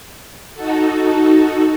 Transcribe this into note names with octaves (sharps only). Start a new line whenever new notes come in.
D#4 F#4 A4